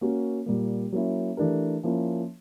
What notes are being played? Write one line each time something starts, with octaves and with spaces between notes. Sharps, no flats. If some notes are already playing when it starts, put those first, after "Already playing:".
A#3 C#4 F#4
A#2 G3 A#3
F#3 A#3 C#4 E4
E3 A3 D4 G4 A#4
F3 A#3 C#4 E4